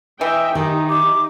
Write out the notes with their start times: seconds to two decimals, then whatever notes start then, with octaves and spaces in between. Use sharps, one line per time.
0.21 E3 D#5 E5 G5
0.55 D#3 D#4 G4
0.89 D6